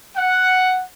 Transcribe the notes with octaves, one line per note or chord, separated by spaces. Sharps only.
F#5